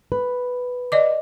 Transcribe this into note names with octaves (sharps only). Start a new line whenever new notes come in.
B4
D5 D#5 D6